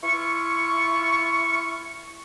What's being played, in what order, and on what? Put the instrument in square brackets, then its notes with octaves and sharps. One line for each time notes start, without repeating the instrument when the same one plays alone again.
[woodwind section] E4 F4 C#6